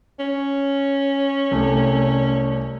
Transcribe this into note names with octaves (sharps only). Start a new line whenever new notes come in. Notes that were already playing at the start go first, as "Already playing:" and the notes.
C#4
C2 A3